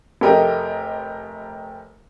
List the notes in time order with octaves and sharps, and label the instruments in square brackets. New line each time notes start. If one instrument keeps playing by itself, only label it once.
[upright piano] F1 A3 G4 A#4 D#5